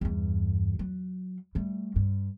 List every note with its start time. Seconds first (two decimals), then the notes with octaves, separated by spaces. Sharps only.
0.01 E2 G2
0.79 F#3
1.55 G3 A3
1.96 G2